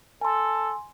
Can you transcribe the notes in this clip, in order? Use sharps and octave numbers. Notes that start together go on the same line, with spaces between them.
A4 G#5 C6